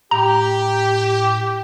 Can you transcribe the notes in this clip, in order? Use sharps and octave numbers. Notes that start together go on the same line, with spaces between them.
A2 G4 A#5